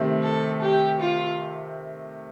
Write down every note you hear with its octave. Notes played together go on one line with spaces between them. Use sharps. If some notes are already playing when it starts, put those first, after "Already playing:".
Already playing: C3 D#3 A3 C4
A4
G4
F4